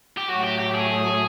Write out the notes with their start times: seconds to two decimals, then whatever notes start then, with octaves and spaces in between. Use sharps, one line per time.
0.17 G4
0.28 A2 F#3 A3 F#4
0.43 G4
0.59 G4
0.74 G#4